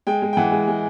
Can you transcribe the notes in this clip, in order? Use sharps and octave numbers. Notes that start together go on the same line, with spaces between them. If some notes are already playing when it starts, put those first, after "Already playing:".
G#3 G5
G#3
G5
E3 F#5
G#3
G#3